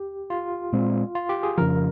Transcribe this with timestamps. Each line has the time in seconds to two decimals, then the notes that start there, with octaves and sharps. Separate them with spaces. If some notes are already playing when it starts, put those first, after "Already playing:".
Already playing: G4
0.30 F4
0.72 A#2 G#3 C4
1.15 F4
1.29 G4
1.43 G#4
1.57 F2 C#3 F3 A#4